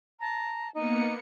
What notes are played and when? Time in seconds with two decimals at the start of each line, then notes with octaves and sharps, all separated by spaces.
0.20 A5 A#5
0.74 A#3 B3 D#4 C#7